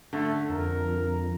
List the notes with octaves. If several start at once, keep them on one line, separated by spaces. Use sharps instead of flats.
D3 A3
F2 A#4